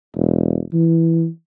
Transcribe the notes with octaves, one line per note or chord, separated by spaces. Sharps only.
E1
E3